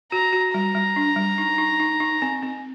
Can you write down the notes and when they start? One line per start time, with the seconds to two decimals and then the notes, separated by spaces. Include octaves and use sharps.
0.12 F#4 A#5
0.33 F#4
0.53 G3 A#5
0.75 G3
0.96 D4
1.16 G3
1.38 D#4
1.58 D#4
1.80 D#4
2.00 D#4
2.22 C4
2.43 C4